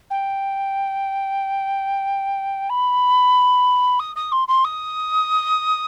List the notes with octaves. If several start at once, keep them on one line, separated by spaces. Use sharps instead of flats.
G5
B5
D#6
D#6
C6
C6
D#6